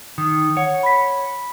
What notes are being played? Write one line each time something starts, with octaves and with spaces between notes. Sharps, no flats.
D#3 D#6
C#5 F#5
B5 B6